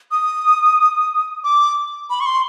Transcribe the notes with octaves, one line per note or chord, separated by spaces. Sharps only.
D#6
D6
B5
C#6
C6